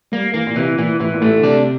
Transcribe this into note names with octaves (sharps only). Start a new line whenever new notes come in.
G3 A#3
E3 A#3
A#2
C3 E3
A#2 E3
A2 E3
A#2
A2 A3
D3
C3 D4